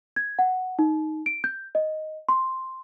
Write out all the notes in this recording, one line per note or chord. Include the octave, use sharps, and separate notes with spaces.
G#6
F#5
D#4
D7
G6
D#5
C6